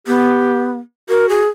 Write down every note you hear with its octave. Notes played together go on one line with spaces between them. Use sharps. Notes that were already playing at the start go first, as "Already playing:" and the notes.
B3 G4
F#4 A#4
G#4